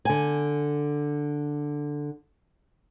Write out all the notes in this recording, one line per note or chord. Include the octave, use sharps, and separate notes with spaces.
D3 G#5